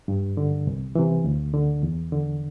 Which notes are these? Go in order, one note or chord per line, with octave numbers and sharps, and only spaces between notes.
G2
D3
C2
C3 E3
D2
D3
E2
D3